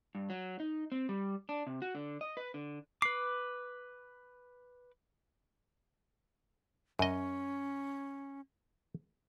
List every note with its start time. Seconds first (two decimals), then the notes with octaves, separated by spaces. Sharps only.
0.15 G2
0.30 F#3
0.60 D#4
0.92 C4
1.09 G3
1.49 D4
1.67 C3
1.82 F#4
1.95 D3
2.21 D#5
2.37 B4
2.54 D3
3.02 B4 D6 C7
6.99 F#2 C#4 D#5